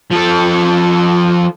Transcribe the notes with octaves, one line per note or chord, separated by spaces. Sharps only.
F3 A4